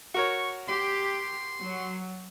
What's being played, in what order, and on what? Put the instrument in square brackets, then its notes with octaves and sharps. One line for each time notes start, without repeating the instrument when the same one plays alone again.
[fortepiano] F#4 A#4 C#5 [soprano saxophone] C#6
[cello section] G4 [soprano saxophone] C6
[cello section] F#3